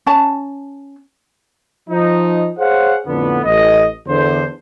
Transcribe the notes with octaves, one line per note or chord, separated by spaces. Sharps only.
C#4 A5
F3 D#4
G#4 C5 C#5 F5 F#5
F2 A2 D3 B3
A1 D#5
E2 D3 C5